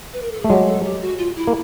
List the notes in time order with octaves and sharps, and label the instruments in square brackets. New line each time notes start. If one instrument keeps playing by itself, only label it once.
[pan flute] B4
A#4
A4
[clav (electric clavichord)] A3 [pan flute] G#4
[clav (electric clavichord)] F#3 G#3 [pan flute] G4
[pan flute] A4
G4
F#4
F4
E4
[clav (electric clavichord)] A#3